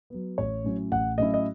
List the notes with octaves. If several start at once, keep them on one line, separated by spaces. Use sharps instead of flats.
F#3 B3
A1 C#5
A2 F#3 C#4 E4
A1 F#5
A2 F#3 C#4 E4 D#5
D#5